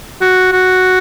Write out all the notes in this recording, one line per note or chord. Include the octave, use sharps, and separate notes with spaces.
F#4
F#4